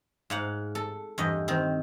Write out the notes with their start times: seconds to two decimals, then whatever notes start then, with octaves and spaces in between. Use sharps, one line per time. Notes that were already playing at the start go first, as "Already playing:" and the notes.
0.30 G#2 F5 F#5
0.75 A4
1.18 E2 G2 D#5
1.48 D#3 C4